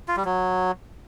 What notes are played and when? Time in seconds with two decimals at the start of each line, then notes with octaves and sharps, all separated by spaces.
0.08 F4
0.17 G3
0.25 F#3